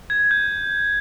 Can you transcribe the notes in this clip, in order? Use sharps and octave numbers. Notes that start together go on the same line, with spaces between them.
G#6
G6